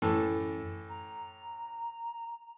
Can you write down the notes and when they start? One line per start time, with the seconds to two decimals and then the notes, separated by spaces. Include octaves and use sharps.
0.02 F#2 A2 E3 A4
0.89 A#5